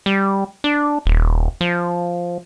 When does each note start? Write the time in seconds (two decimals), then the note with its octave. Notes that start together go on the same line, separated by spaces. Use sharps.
0.06 G3
0.64 D4
1.05 D#1
1.61 F3